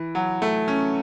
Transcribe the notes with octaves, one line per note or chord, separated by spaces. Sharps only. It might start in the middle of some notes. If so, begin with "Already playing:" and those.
Already playing: E3
F#3
A3
C#4